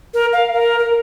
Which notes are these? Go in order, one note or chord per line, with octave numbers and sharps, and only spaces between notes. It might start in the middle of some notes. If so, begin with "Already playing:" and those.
A#4
F5
A#4
A#4